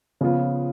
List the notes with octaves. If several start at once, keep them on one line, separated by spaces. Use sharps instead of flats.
C#3 F3 B3 F4